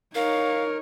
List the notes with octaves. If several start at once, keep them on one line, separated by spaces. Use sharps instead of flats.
D#4 A#4 C#5 F5